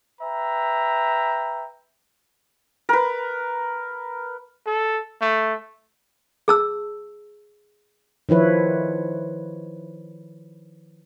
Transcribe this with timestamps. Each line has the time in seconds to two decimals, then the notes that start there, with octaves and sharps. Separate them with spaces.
0.21 B4 E5 G5 A#5
2.89 A#4 B4
4.67 A4
5.21 A3
6.48 G#4 A5 E6
8.29 D#3 F3 E4 B4 C#5